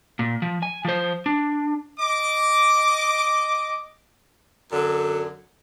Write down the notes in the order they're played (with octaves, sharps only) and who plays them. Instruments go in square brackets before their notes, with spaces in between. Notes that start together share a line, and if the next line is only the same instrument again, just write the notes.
[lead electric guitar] A#2
F3
G#5
F3 C5
D4
[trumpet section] D#5 D6
[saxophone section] F#2 D3